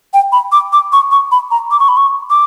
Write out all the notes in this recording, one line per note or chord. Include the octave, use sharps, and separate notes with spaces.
G5
B5
D6
D6
C#6
C#6
B5
A#5
D6
C#6
B5
C#6
D6